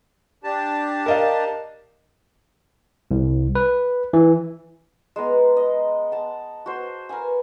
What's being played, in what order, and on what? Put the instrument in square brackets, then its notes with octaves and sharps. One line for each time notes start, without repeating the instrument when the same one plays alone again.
[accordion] D4 G4 A5
[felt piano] A#4 D#5 F5
[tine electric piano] C2
B4
E3
[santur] G#3 B3 A#5
D#5
F#5 A5
F#4 C5
A#4 B4 F#5 G#5